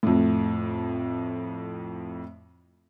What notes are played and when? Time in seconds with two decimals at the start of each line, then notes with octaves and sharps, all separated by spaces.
0.03 F2 A2